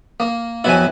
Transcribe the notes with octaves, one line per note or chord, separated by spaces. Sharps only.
A#3
F2 F#3 B3 E4 G#5